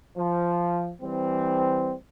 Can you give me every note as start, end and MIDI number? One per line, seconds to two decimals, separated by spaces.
0.17 0.91 53
1.02 1.93 52
1.02 1.93 55
1.02 1.93 60